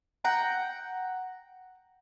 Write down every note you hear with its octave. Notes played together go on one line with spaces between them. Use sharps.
F#5 G5 A#5